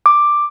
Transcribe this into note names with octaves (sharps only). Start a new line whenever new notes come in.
D6